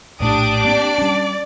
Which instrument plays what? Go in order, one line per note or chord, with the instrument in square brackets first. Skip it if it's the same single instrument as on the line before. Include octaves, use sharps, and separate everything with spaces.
[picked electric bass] A#1 A2 A3 [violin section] D4 G4 D6 [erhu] D#6
[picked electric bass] A#3 C4 [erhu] D5
[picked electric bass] G3 C#4